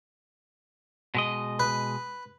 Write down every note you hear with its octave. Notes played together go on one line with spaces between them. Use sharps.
B2 G#3 D#5
B4